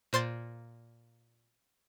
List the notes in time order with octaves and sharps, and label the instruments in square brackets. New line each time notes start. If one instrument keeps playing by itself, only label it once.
[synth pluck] A#2 C5 C6 A6